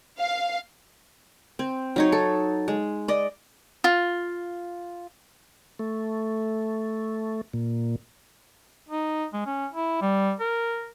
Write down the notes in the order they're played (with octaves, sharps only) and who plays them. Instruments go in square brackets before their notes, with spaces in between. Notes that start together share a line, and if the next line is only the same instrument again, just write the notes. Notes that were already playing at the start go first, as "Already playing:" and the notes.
[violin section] F5
[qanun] C4
F#3 D#4 C#5
A4
G#3
D5 D#5
[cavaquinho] F4
[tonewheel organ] A3
A#2
[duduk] D#4
G#3
C#4
E4
G3
A#4